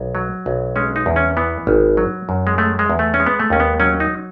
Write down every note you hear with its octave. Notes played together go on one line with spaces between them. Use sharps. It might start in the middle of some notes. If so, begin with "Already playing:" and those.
Already playing: B1
F#3
B1
G#3 C#4
D#4
E2
C#4
E3 B3
G#1
F#3
F#2
G#3
G#3 A3
G#3
E2
A3
C#4
G#3
B3
A3
D#2 C#4
B3
F#3 C#4
D#4